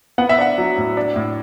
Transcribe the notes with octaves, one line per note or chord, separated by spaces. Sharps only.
B3 F#5
E5
D4 F#5
F#3
A2
D4
A2